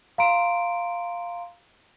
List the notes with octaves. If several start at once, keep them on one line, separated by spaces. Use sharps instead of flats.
F5 A#5 C6 D7